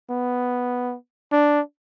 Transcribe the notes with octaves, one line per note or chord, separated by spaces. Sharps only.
B3
D4